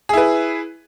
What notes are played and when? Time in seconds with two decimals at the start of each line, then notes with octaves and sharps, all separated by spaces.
0.09 G#4
0.13 E4
0.17 B4